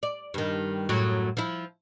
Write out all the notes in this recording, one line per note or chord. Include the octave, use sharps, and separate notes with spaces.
D5
G2 D#3
F#2 A2 F#3
F3 E4